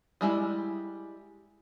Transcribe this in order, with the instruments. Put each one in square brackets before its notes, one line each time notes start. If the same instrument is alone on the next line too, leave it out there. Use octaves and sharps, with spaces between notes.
[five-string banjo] G3 G#3 E4